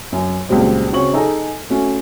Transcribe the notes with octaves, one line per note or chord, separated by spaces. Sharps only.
F#2
C#2 A#2 F#3 G3 C4
C#3 C4 F#4 C#5 C#6 F#7
D#4 G#4 A4 D#5 G#5 A#5
A3 C#4 F#4